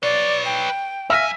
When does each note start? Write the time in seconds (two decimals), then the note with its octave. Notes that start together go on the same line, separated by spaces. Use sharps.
0.03 B4 C#5 D5
0.45 G5
1.10 F#2 E5 F5 G#5 E6 A#6 B6